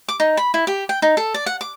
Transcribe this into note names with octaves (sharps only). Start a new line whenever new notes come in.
D6
D#4
B5
E4
G4
G5
D#4
A4
D5
F#5
D6